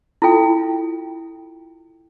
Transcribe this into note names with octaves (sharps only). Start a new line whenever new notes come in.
E4 F4 A4 G5